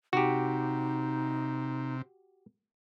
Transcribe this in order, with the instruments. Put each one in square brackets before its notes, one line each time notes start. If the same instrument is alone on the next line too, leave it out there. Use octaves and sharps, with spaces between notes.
[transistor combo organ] C3 [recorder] D#4 [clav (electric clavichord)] F#4 G4